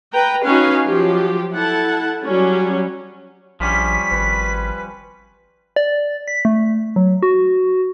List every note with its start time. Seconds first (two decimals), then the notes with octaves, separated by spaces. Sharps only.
0.13 B4 G5 A#5
0.44 C#4 D#4 F#4 B4 F5
0.85 F3 F#3 G4
1.52 E4 A4 F#5 A5
2.24 F#3 G3 C#4
3.60 A#1 F3 G3 C#4 B6
4.12 G#1 B4
5.76 D5
6.28 B6
6.45 A3
6.96 F#3
7.23 F#4